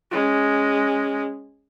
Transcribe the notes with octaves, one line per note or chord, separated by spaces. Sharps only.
G#3 C#4